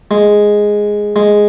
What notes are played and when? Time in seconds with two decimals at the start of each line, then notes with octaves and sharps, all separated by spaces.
0.11 G#3
1.16 G#3